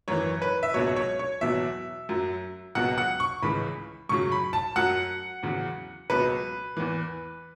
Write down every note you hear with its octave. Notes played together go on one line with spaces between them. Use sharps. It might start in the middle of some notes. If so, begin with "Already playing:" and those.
F#2 E3 C#5
B4
E5
C#2 B2 F#3 C#5
C#5
C#5
E2 B2 F#3 E5
F#2 F#3
C#2 B2 F#3 F#5
F#5
C#6
C#2 C#3 E3 B5
F#2 C#3 F#3 C#6
B5
A5
F#2 F#3 F#5
E2 C#3 F#3
C#2 B2 F#3 B4
E2 E3